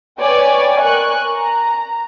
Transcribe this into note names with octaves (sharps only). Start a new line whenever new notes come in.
B4 C#5 D5 G5 G#5
A#4 G#5 C#6 F#6
A#5